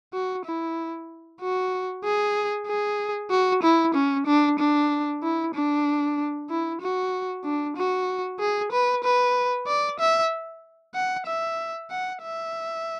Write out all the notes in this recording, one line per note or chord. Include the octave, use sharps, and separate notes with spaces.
F#4
E4
F#4
G#4
G#4
F#4
E4
C#4
D4
D4
E4
D4
E4
F#4
D4
F#4
G#4
B4
B4
D5
E5
F#5
E5
F#5
E5